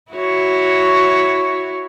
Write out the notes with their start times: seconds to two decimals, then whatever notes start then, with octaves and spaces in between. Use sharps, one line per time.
0.12 E4 F#4 C#5